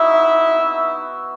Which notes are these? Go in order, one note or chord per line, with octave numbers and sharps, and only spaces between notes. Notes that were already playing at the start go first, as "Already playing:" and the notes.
Already playing: C4 D#4 E4 F#4 E5
B3 D#4 F#4